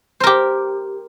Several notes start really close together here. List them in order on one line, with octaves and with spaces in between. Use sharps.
C5 A#4 G4